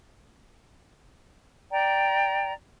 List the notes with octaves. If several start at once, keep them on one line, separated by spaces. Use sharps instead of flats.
D5 G5 A#5